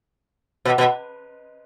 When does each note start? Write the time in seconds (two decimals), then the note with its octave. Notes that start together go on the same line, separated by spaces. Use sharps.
0.65 B2
0.78 B2